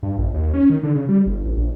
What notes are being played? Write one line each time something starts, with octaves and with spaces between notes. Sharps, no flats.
G2
A#1
D#2
C#4
D#3
D3
C#3
G3
G1
A1
A#1